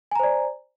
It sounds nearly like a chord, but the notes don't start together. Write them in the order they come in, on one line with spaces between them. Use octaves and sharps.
G#5 A#5 C5 D5